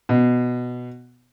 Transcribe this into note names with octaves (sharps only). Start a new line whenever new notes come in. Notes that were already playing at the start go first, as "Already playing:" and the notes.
B2